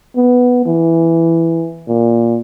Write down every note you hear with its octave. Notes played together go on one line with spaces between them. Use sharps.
B3
E3
A#2